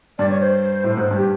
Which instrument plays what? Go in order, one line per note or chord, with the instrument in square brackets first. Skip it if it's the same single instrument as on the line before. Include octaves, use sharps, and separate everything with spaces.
[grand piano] G2 [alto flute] D5
[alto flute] C#5
C5
[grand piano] A2
G#2
G2
[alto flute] G4